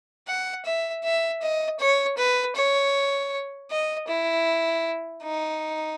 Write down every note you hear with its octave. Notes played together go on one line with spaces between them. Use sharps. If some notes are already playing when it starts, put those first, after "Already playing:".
F#5
E5
E5
D#5
C#5
B4
C#5
D#5
E4
D#4